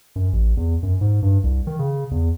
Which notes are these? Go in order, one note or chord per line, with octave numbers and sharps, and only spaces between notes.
F#2
A1
E2
F#2
G#2
G2
C2
D#3
C#3
E2